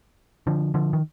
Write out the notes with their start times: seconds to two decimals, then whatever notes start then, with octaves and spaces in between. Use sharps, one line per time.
0.47 D3 F3
0.74 D3 F3
0.93 D#3